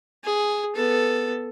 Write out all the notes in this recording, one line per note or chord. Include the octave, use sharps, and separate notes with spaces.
G#4
B3 A4